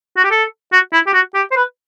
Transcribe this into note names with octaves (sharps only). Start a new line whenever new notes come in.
F#4
G4
A4
F#4
E4
G4
F#4
G4
C5
B4